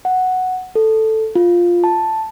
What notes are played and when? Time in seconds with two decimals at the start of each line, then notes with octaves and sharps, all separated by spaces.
0.05 F#5
0.75 A4
1.35 F4
1.84 A5